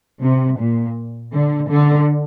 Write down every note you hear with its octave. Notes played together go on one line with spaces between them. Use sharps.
C3
A#2
D3
D3